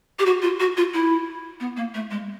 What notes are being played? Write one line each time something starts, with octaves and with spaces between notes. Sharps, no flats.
G4
F#4
F4
F#4
F4
E4
B3
A#3
A3
G#3